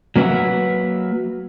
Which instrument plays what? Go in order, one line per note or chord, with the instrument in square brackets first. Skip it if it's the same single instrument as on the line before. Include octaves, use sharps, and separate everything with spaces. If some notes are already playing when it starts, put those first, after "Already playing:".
[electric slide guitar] F#3 A#3 B4 C#5 E5 F#5